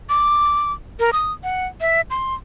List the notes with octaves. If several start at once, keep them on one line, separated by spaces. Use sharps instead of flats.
D6
A#4
D#6
F#5
E5
C6